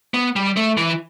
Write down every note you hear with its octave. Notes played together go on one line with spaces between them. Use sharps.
B3
G3
A3
E3